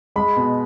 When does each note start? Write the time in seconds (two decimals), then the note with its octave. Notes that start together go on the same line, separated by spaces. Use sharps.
0.16 G#3 B5
0.37 B2